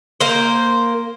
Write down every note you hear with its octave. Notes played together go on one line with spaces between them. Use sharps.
A#3 C5